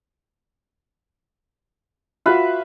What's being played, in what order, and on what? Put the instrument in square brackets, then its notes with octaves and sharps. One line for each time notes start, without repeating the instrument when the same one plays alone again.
[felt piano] F4 F#4 [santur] B4 E5 F5